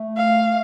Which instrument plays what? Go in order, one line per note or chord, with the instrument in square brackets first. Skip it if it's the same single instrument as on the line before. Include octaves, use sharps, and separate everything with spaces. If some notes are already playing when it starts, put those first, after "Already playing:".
Already playing: [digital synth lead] A3
[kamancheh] F5